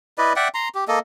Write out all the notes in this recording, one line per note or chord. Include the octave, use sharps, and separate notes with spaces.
E4 B4 D5 D#5
D5 E5 F#5 G5
A#5 C6
G4
A#3 A4 D#5